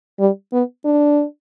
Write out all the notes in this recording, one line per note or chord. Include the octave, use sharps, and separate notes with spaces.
G3
B3
D4